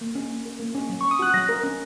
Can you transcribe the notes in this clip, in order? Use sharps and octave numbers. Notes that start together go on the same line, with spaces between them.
A#3
C#4
A#3
A#4
A#3
C#4
F#3
C#4 C#6
D#6
F#4 F#6
F#3 A#6
A#4
C#4